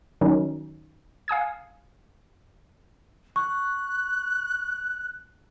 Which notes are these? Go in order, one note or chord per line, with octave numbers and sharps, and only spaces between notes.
D#3 F#3 C#4 D#4
F5 G#5 D#6 G#6
C#6 F#6